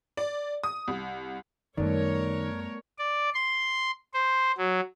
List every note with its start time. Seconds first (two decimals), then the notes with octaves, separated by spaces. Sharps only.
0.17 D5
0.64 D#6
0.88 C2
1.77 F#2 D#3 G3 A3 B3 A#4 C#5 D5
2.98 D5
3.34 C6
4.14 C5
4.58 F#3